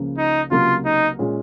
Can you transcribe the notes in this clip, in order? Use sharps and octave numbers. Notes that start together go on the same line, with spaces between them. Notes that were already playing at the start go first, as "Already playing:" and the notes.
Already playing: C#2 C#3 F3 A#3
D#4
C#2 C3 F#3 A#3 F4
D#4
A#2 G#3 C#4